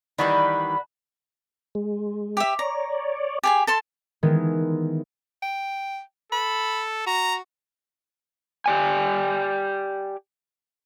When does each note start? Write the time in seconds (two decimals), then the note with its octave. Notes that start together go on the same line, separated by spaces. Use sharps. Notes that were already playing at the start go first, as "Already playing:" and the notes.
0.18 D#3 E3 G3 D4 F#4 B4 B5
1.75 G#3
2.37 G4 E5
2.59 C#5 D5 A#5
3.43 G4 G#4 G#5
3.67 A4 A5 C6
4.23 D#3 E3 G#3 B3
5.42 G5
6.32 A4 B5
7.07 F#4 A#5
8.66 G4 D5 G#5